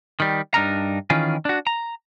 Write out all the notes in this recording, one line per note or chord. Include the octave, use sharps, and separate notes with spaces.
D#3 G3
G2 D4 D#4 A#4 A#5
D#3 E3 C#4 F4 G#4
D4 F#4
A#5